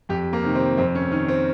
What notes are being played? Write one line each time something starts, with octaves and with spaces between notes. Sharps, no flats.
F2 G4
A#3
C3 D#3
C4
F2 C4
C#4
D#3 C#4
C4